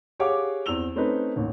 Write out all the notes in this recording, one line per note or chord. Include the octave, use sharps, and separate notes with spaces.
G4 G#4 C#5 F5 F#5 D6
E2 C4 E6 F7 G7
A3 C4 C#4 D#4 B4
A1 D#2